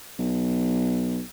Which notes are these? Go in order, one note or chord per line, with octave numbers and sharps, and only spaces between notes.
B1